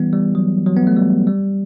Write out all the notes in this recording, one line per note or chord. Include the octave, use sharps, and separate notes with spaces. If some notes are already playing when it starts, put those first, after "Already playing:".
Already playing: E3 G3 B3
G3
F#3
F#3
B3
A3
G3
G3